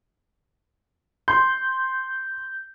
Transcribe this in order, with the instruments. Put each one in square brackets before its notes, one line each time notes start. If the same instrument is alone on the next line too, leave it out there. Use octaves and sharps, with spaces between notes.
[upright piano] C6 [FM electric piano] G6